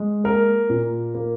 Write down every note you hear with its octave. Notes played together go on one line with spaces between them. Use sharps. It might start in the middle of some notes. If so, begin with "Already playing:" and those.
Already playing: G#3
A#3 A#4
A#2
A#3